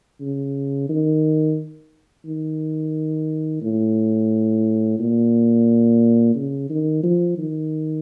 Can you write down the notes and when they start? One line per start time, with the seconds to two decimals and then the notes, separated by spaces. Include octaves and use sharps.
0.21 C#3
0.89 D#3
2.26 D#3
3.62 A2
4.99 A#2
6.35 C#3
6.70 D#3
7.03 F3
7.38 D#3